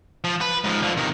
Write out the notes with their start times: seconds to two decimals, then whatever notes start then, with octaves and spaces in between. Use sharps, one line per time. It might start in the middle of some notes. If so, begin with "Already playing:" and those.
0.24 F3
0.41 B4
0.64 G#2 F3
0.82 D3 F3
0.97 C3 D#3